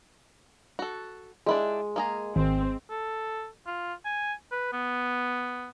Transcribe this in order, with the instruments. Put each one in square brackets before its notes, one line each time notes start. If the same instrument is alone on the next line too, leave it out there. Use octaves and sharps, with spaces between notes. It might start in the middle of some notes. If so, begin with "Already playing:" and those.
[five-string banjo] F#4 A4
[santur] G#3 [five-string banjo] D4 E4 G4
[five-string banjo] A#3 G#4 A#5
[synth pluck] G#1 [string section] C4
[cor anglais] A4
F4
G#5
B4
B3